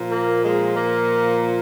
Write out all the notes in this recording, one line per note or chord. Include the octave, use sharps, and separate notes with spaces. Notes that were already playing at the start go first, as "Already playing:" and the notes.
Already playing: A#2 F3
A#3
G#3
A#3